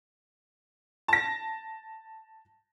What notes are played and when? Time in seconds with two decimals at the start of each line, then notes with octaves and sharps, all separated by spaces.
1.08 A5 A#6